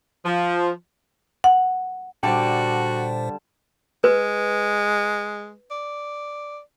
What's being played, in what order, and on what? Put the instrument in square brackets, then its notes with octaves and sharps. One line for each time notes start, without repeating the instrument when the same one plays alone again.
[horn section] F3
[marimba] F#5
[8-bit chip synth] A#2 C5 [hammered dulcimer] D3 G3 A5 [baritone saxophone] F#4 [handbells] G5
[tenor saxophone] G#3 [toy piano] B4
[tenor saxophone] D5